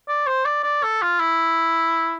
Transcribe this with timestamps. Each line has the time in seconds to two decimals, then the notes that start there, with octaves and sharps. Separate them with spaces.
0.08 D5
0.27 C5
0.45 D5
0.64 D5
0.83 A4
1.02 F4
1.20 E4